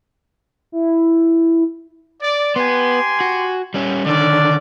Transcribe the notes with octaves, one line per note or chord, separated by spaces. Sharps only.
E4
D5
B3 G4 G#5 C6
F#4
G3 C#4
D3 D#3 C#4 D4 D5